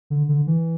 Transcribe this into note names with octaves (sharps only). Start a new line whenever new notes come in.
D3
D3
E3